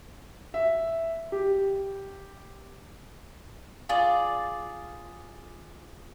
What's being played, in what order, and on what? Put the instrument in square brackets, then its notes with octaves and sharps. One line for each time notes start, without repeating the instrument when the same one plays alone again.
[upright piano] E5
G4
[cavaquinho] F4 G#4 D5